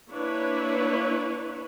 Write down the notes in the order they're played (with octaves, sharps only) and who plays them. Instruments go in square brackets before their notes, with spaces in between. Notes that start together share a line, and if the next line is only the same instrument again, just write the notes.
[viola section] A#3 D4 E4 B4 C#5